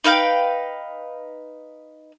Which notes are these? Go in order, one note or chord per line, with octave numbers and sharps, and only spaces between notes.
D#4 B4 F5 G5